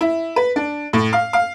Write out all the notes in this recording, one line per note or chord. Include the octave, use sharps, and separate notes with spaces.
E4
B4
D4
A2
F5
F5